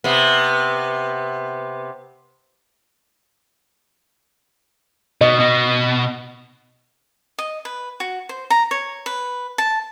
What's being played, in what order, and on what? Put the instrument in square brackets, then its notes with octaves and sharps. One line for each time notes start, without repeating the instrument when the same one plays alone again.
[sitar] C3 B3
[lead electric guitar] B2 [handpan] D#5
[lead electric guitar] B2
[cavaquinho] D#5
B4
F#4
C5
A#5
C#5
B4
A5